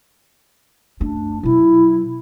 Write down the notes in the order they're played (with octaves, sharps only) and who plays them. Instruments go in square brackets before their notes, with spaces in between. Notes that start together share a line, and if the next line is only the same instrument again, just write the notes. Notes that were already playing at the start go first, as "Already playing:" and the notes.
[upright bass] F#2 A3 [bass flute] D4
[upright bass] B2 F#3 [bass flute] E4